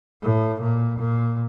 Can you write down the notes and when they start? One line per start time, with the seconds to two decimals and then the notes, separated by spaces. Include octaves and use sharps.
0.22 A2
0.61 A#2
0.99 A#2